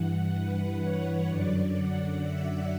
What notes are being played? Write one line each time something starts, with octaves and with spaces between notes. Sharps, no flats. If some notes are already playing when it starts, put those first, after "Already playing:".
Already playing: G2 E3 F#5
B4
C#5
F#2 D3 F#3 D5
F#5
E5